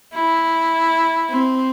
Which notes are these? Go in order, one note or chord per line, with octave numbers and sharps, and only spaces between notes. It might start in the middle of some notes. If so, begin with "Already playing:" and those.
E4
C4